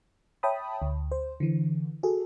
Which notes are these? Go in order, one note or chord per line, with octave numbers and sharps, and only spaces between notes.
C#5 E5 G5 A5 B5 D#6
D2
C5
D3 E3
F#4 G#4 A4